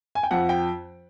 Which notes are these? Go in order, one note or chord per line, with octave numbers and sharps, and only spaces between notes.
G#5
G5
F2 F#5
G5